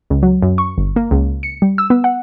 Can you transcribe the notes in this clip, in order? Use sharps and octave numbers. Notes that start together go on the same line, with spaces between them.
C#2
F#3
F#2
C#6
G1
A#3
C#2
C#7
G3
E6
B3
F#5